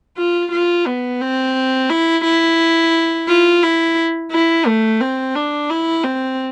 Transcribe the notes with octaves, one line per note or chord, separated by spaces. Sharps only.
F4
F4
B3
C4
E4
E4
F4
E4
E4
A3
C4
D4
E4
C4